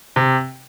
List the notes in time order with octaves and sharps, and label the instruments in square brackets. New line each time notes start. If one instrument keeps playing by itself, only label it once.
[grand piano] C3